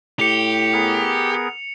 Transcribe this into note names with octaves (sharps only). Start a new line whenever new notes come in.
A2 G4 C#7 F7
B3 G#4 A#4